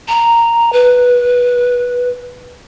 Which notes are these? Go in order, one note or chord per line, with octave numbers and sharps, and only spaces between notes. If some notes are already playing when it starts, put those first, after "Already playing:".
A#5
B4